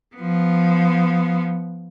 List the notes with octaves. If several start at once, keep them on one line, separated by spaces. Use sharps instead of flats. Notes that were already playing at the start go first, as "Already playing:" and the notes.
F3 B3